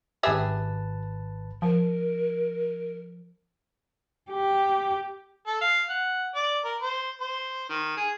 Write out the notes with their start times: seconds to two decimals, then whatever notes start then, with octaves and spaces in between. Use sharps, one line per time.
0.23 G#1 G4 G#4 B4 E5 A5
1.62 F3 A#4
4.31 G4
5.47 A4
5.61 F5
5.90 F#5
6.35 D5
6.64 A#4
6.82 C5
7.21 C5
7.70 D#3
7.97 G#4